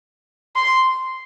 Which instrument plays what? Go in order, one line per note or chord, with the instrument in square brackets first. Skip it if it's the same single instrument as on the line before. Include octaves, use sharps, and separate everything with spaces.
[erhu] C6